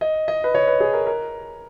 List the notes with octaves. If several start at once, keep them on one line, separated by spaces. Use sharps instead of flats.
D#5
D#5
B4
C#5
B4
G#4
A#4
A#4